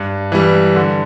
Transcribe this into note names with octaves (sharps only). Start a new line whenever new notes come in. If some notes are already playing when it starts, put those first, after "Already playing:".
Already playing: G2
E3 G3
D3